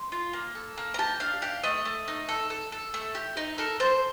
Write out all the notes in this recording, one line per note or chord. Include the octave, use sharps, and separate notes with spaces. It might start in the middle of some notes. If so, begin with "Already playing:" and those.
Already playing: C6
F4
A#3
A4
A#3
A#5
G4 A5
D4 F5
G4 F5
A3 D#5
A3
D#4
A4
A4
A4
A3
G4
D#4
A4 A#4
A4 C5